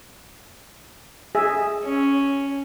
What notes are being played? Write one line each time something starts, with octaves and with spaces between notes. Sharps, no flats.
G#4 E5
C#4